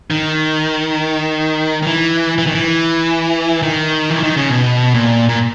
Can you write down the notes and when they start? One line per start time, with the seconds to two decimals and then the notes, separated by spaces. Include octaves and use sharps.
0.11 D#3
1.83 D#3
1.87 E3
2.38 E3
2.46 D#3
2.55 E3
3.62 D#3
4.10 E3
4.23 D#3
4.37 C#3
4.50 B2
4.94 A#2
5.29 A#2